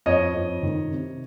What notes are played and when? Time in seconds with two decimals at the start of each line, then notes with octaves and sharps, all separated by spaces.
0.06 F2 C#5 D#5
0.34 F2
0.63 D#3
0.92 C3